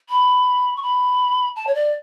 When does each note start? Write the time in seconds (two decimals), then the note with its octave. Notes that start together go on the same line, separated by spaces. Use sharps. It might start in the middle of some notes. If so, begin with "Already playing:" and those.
0.10 B5
0.77 C#6
0.83 B5
1.56 A5
1.67 C#5
1.75 D5